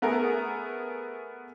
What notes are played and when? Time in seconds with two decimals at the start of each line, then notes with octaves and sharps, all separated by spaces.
0.02 A3 B3 G#4 A#4